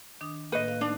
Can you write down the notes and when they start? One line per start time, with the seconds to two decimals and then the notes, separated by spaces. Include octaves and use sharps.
0.21 D#3 D4 D#6
0.52 A2 A#3 B4 D#5 G6
0.68 F5
0.81 A3 D4 D#4 A5